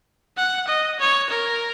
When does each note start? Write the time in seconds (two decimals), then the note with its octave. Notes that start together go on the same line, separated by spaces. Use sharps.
0.37 F#5
0.68 D#5
1.00 C#5
1.30 A#4